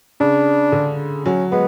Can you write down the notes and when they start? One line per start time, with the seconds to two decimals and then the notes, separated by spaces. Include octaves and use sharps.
0.20 C#3 D4
0.72 D3
1.26 F#3 C#4
1.51 G#3 B3